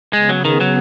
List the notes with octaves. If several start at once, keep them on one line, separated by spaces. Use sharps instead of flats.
C#3 G#3 B3 G#4
F#3
D#3
F#3